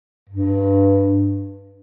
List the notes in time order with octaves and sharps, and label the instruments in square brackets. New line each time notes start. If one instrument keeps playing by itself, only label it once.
[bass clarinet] G2